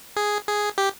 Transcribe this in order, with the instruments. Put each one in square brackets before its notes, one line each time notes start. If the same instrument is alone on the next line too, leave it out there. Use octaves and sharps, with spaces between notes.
[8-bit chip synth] G#4
G#4
G4